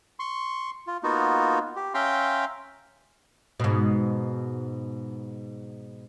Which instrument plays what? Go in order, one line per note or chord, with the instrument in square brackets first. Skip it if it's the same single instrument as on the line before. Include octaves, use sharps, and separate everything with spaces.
[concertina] C6 C#6
F4
A#3 B3 D#4 F4 F#4
G4
C#4 E5 F5 G5 A#5 C6
[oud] G#2 B2